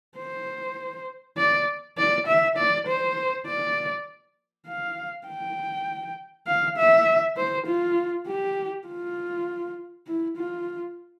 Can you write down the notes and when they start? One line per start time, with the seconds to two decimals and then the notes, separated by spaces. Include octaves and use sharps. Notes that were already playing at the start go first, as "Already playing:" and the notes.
0.17 C5
1.37 D5
1.98 D5
2.27 E5
2.57 D5
2.87 C5
3.47 D5
4.67 F5
5.27 G5
6.47 F5
6.77 E5
7.37 C5
7.67 F4
8.27 G4
8.88 F4
10.07 E4
10.37 F4